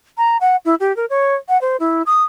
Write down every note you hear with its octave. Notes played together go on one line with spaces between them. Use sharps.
A#5
F#5
E4
G4
A#4
C#5
F#5
C5
E4
D#6